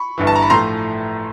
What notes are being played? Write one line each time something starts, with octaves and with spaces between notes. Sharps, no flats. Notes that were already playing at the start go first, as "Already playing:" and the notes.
Already playing: B5 C#6
G1 G2 E3
A5
A#5
B5
A2 F3 A3 A#5 C6